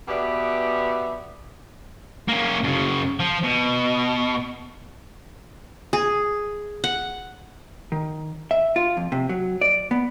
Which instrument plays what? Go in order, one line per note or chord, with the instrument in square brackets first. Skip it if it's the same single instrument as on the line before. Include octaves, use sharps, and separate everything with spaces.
[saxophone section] B2 B3 G4 G#4 D5 E5
[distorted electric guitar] A#3 C#4
F#2 C#3
F3
B2
[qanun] G#4
F#5
[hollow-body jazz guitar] D#3
E5
F4
F2
C3
F#3
D5
B3